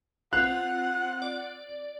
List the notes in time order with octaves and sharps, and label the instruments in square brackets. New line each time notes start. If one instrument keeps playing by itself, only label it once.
[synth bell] C4 F4 [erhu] F#5 [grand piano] F#6
[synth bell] D5